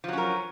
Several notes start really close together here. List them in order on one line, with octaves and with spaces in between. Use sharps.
F3 F#3 C#4 A#4